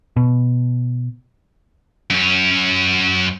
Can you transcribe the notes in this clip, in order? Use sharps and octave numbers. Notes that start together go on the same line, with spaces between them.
B2
F#2 C#4